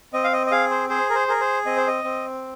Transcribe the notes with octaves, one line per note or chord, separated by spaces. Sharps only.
C4 D#5
F5
D#5
D#5
G#4 F5
C5
G#4 C5
A#4
C5
G#4 A#4
C5
C4 D#5
C5
D#5
C4